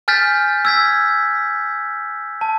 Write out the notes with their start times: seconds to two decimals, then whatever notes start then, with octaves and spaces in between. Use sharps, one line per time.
0.08 G#5 F6 G6 A6 B6
0.65 E6 G#6 B6
2.41 A5